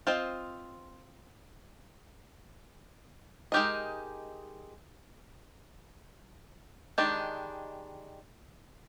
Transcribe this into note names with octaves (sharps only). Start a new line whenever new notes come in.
C4 F4 C5 D#5
G#3 D#4 G4 A#4 D#5
D#3 G#3 D4 G4